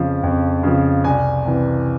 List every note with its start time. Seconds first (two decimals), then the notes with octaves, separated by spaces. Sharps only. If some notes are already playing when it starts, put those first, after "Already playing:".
Already playing: F2 C#3 F3
0.23 F2
0.63 C#3 F3
1.04 C2 G#5
1.45 C3 E3